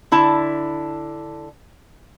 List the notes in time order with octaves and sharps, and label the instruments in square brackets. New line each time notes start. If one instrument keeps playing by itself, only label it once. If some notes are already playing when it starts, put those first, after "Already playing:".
[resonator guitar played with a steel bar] D3 E4 A5